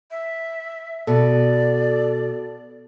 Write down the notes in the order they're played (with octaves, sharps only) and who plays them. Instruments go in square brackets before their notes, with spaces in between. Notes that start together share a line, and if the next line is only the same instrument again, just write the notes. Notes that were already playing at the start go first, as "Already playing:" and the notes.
[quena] E5
[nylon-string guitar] B2 [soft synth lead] A4 [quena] D5